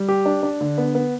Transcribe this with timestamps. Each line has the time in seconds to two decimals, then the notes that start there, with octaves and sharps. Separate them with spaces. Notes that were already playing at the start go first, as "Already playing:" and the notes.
Already playing: G3
0.08 G4
0.26 D4
0.43 D4
0.61 D3
0.78 B3
0.95 B3